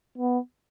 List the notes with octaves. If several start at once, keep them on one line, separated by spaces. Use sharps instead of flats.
B3